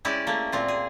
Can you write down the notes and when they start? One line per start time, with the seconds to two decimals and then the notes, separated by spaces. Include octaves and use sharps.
0.05 G#3 C#4 E4 G4 D5
0.27 A3 A#3
0.52 A#2 C4 F4
0.68 G#4